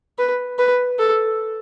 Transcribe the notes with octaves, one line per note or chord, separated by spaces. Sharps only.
B4
B4
A4